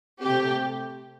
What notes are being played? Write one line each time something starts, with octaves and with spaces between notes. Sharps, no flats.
C3 A3 C4 G4